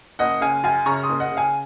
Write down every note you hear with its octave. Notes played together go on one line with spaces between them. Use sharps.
F#1 D#5 F#5
C#3 F5 G#5
F#2 F5 G#5
C#3 A#5 C#6
C6 D#6
F#1
D#5 F#5
C#3
F5 G#5